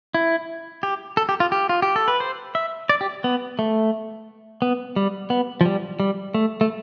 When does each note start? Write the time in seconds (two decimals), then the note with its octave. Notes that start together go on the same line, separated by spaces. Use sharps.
0.14 E4
0.83 G4
1.17 A4
1.29 G4
1.40 F4
1.52 G4
1.69 F4
1.82 G4
1.96 A4
2.08 B4
2.20 C5
2.55 E5
2.89 D5
3.01 G4
3.24 B3
3.59 A3
4.62 B3
4.96 G3
5.30 B3
5.61 F3
5.66 G3
6.00 G3
6.34 A3
6.61 A3